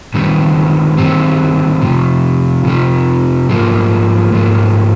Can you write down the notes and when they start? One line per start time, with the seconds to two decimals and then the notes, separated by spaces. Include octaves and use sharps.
0.14 G2 D#3 G3 C4
0.98 G2 D#3 G3 C4
1.82 F2 C3 F3
2.64 F2 C3 F3
3.49 G#2 F3 A#3
4.32 G#2 F3 A#3